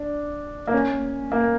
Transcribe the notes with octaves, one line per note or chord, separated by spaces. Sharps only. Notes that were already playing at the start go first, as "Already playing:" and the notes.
Already playing: D4
A#3
C#4
A#3